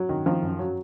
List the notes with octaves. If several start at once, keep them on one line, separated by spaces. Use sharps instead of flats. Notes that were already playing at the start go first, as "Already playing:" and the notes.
Already playing: F#3
D#3
D#3 F3
F#2
F#3